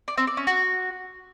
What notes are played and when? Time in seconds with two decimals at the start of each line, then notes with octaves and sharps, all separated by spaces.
0.08 D5
0.18 C4
0.27 D5
0.37 C#4
0.47 F#4